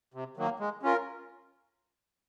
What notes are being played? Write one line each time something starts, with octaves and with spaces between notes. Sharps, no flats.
C3
D#3 F#3 A#3
G#3
C#4 F4 A#4